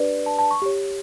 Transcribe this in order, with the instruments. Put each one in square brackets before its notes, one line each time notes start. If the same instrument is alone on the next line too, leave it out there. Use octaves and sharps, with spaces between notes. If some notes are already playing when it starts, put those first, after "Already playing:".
Already playing: [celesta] D4 G4 B4 D5
A5
A5
C#6
G4 C#5